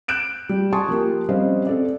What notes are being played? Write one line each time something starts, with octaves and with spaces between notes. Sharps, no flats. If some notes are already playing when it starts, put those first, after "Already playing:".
F#6 G6 D7 E7
G3 G4
G#5 A5 C6 C#6 D#6
F3 A#3 G4 A#4
G3 C4 C#4 C5 D#5 F5
C4 A4 D5